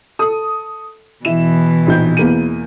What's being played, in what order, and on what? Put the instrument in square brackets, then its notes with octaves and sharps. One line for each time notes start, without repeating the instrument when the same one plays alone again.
[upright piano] A4 D#6
[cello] B2 E3 [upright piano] E4 E7
[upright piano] A#1 D#4 G6
E2 A#3 D#7